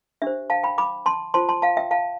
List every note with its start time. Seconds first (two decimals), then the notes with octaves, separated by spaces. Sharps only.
0.22 D4 G4 C5 E5
0.50 F5 A5
0.63 G5 B5
0.78 B5 D6
1.06 A5 C6
1.34 F4 C5 A5 C6
1.49 A5 C6
1.62 F5 A5
1.77 E5 G5
1.91 F5 A5